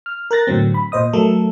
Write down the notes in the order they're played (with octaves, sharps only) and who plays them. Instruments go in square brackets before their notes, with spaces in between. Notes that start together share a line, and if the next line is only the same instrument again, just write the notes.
[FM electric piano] F6
A#4 F#6 A6 A#6
A2 D3 F#3 C4
B5
A#2 C5 D#5 D#6
F#3 A3 A4 A#4